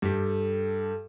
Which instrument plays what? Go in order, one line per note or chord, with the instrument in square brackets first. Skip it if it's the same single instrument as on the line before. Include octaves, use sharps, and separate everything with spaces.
[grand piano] G2 G4 [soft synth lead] A4